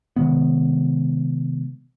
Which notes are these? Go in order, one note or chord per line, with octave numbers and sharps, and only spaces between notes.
C3 D#3 G#3 B3